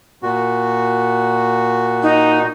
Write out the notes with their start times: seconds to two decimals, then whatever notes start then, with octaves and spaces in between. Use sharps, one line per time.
0.22 A#2 F#4
2.03 D#4